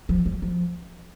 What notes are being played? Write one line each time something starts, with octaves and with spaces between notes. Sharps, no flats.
F3
G3
F3